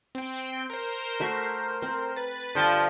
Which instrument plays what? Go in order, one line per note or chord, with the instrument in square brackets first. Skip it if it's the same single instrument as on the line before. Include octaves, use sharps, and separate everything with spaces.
[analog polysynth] C4 G5
A#4 C5
[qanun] A3 F#4 E5
C4
[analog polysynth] B4 A6
[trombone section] G2 F3 [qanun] D3 G5 C6